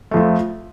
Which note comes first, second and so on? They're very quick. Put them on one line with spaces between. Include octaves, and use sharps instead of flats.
A3 F2 F3